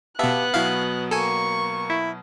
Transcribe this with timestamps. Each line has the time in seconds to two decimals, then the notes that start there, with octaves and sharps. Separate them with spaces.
0.19 B2 B3 G4 E5 F5 A5 F#6
0.54 B2 F#3 E4 F5
1.11 A#3 A4 G#5 C#6
1.90 E4